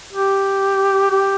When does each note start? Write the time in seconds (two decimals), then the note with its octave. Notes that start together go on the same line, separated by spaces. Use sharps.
0.13 G4
1.11 G4